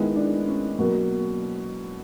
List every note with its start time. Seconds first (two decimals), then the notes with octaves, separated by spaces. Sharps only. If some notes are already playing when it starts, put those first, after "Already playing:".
Already playing: D#3 G#3 B3 E4
0.16 D4
0.47 C#4
0.79 B2 F#3 A#3